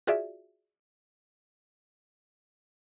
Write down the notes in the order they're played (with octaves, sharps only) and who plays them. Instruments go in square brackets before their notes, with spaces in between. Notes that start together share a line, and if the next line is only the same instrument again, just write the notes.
[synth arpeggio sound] F4 F#4 G#4 D5 E5